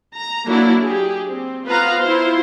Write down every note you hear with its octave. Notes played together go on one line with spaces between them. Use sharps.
A#5
F#3 A#3 D4 E4
G4 G#4
C4
B3 F4 B4 C5 F5 A#5
E4 F4 C5